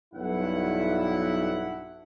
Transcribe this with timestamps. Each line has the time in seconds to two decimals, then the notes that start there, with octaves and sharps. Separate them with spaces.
0.14 B1 G2 E4 F#5